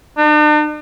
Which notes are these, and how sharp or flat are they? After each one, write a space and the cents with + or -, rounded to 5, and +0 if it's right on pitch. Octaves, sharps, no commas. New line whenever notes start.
D4 +45